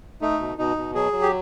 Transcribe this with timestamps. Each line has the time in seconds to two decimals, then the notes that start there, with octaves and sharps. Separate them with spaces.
0.21 A3 D#4
0.39 B2
0.58 B2 D#4
0.77 B2
0.95 F#3 G#4
1.12 F#3
1.22 G4